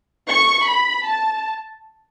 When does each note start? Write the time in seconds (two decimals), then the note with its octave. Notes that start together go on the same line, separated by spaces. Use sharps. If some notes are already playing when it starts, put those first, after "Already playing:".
0.28 C#6
0.68 B5
1.08 A5